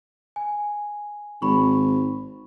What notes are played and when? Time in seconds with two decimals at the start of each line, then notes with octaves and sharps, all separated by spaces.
0.36 G#5
1.42 G#1 B5 C#6